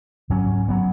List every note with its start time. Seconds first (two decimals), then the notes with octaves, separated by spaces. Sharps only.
0.30 G#2 F#3 C#4
0.68 F#3 B3